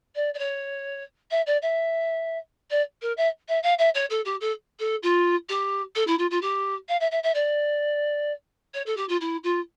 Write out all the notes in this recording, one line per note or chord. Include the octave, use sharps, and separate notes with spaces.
D5
D5
C#5
E5
D5
E5
D5
A#4
E5
E5
F5
E5
C#5
A4
G4
A4
A4
F4
G4
A4
E4
F4
F4
G4
F5
E5
E5
E5
D5
C#5
A4
G4
F4
E4
F4